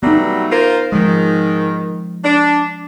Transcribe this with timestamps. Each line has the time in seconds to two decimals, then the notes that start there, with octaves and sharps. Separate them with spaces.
0.03 F#3 G3 A3 B3 D#4
0.52 F4 A#4 C5
0.92 G#2 D#3 F3 G#3
2.25 D4